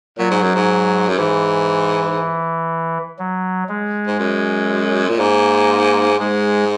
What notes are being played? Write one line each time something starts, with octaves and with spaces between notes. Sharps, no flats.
A#2 F#3
G#2
F#2
G#2
F#2
G#2 E3
F#3
G#3
G#2
F#2
A#2
G#2 A#3
G#2 G#3